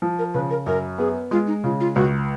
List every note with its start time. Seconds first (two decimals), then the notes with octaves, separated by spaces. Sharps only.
0.02 F3
0.19 A#4
0.34 C#3 B4
0.50 A#4
0.66 F#2 A#4
0.98 B3 G#4
1.31 G#3 F4
1.47 D#4
1.64 C#3 F4
1.80 F4
1.96 C#2 F#4